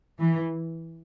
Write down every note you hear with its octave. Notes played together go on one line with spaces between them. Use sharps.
E3